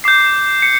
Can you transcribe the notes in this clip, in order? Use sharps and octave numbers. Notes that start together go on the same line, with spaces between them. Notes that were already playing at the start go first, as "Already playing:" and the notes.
D6 G6 C7
C#7